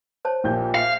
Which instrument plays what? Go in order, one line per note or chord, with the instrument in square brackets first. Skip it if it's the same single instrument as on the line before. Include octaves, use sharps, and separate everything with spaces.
[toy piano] C5 C#5 A5
[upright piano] A#1 A#2 G6 [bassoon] G4
[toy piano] E5 [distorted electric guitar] F5